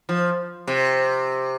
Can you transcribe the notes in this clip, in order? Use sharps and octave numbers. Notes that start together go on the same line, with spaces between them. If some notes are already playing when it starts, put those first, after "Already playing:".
F3
C3